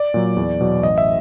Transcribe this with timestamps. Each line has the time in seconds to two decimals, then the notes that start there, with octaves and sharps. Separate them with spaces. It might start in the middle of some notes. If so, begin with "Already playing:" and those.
Already playing: D5
0.14 A#2 F#3
0.37 E2
0.60 B2 F#3
0.82 A1 D#5
0.98 E5